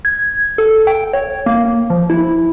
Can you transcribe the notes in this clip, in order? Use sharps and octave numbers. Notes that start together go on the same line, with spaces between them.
G#6
A4
G5
C#5
A#3
F3
E4